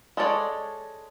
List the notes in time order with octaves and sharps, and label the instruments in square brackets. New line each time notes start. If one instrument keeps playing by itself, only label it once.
[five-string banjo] G#3 A4 C#5 D5